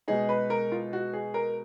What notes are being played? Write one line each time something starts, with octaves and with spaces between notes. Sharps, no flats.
B2 G#3 D#4 G#4
B4
A#4
F4
F#4
G#4
A#4